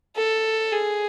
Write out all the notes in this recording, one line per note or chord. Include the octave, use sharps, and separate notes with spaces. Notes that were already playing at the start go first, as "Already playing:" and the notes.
A4
G#4